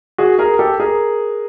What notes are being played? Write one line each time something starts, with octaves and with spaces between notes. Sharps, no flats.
F#4 G#4
G#4 A#4
G4 A4
G#4 A#4